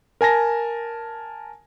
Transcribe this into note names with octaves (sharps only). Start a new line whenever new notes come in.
A#4 G#5 A5 A#6